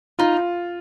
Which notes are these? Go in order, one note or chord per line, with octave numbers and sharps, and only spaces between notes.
D#4 F4